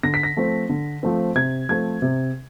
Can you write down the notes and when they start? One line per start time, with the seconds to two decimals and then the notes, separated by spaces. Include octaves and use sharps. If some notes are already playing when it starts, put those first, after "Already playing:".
0.03 D3 A#6
0.14 B6
0.23 A#6
0.37 F3 A3 C4
0.69 D3
1.03 F3 A3 C4
1.35 C3 G#6
1.69 F3 A3 C4 G#6
2.02 C3